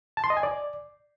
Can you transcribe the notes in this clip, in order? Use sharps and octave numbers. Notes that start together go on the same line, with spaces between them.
A5
C6
D#5
G#5
D5